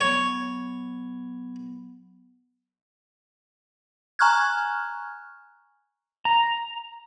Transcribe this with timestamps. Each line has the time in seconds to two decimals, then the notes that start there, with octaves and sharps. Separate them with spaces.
0.01 F#3 B3 C#5
4.19 G#5 A#5 C#6 F6 F#6 G#6
6.25 A#5